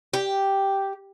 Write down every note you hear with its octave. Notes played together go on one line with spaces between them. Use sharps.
G4